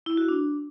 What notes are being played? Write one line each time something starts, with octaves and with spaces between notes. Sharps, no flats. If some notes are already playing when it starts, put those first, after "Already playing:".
E4
F#4
D4